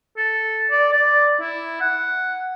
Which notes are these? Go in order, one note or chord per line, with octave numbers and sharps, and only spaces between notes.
A4
D5
D5
E4
F#5